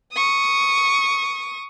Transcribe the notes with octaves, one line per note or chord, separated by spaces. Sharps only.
C#6 D#6